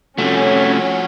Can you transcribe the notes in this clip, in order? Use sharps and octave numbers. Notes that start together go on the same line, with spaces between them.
C3 F3 A3 C#4 F#4